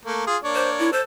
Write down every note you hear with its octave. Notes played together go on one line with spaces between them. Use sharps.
A3 A#3
F4 G#4
A#3 D4 C#5
C5
E4
A4 C5